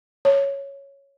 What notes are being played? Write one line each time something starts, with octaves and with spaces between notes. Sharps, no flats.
C#5